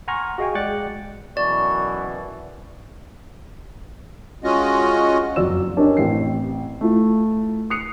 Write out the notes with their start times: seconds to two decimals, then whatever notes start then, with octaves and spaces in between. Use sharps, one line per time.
0.08 F#5 G#5 A#5 C6 C#6 F6
0.38 F#4 G#4 D#5 F5 G5 G#5
0.55 G#3 D5 G5 F#6 A6 C#7
1.37 F#2 B2 E3 D5 C#6
4.44 G#3 C#4 F4 F#4 D#5
5.36 F#1 F2 F#3 D5 E6 E7
5.77 C#4 D4 G4 A#4 D#5
5.97 A1 C4 E4 C7
6.81 A3 E4 F4
7.70 D#6 F#6 C7 C#7 F7